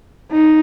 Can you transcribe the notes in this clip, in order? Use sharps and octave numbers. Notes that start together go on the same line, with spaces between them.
D#4